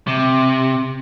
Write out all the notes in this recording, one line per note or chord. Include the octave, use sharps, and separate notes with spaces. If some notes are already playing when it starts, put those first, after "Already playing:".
C3